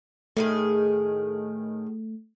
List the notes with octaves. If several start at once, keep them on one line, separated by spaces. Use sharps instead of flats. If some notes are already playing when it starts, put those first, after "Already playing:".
A2 D#3 A3 G#4